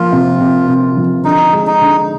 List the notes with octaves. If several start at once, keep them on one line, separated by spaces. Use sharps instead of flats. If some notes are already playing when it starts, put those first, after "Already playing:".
Already playing: F3 A#3 F4
C3
C3
C3
F3
D3 D#4
G#3
D#4
D3